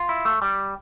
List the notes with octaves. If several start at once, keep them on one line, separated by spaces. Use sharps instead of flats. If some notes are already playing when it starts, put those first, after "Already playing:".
Already playing: F4
E4
A3
G3